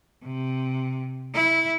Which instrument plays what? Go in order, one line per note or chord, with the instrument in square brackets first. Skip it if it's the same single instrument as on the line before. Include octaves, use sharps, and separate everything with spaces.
[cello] C3
E4